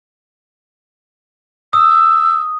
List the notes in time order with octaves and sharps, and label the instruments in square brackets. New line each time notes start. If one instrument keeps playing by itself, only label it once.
[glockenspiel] D#6 [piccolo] E6